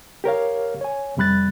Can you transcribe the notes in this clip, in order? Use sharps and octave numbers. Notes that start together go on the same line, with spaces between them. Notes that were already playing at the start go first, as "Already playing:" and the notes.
G4 A#4 C#5 F5
C#5 G#5
F2 C3 G3 B5 F#6 A6